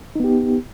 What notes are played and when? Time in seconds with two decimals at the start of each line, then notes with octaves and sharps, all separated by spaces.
0.16 D#4
0.20 B3
0.24 G4